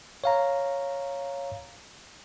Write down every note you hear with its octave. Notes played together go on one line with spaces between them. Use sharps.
C#5 F5 A#5